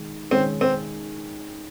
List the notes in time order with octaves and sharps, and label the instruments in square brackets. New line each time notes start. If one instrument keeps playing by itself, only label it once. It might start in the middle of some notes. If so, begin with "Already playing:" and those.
Already playing: [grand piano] D#3 G#3
[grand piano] D#3 G#3 C#4 [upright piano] C4
[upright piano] C4